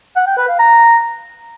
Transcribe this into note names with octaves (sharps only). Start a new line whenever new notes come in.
F#5
G5
B4
F5
A#5